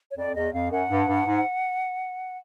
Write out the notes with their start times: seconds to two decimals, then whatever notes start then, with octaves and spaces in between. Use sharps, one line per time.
0.11 C#5
0.17 F2 D5
0.35 E2 D#5
0.54 F2 F5
0.71 F#2 F#5
0.90 G2
1.08 G2
1.26 G#2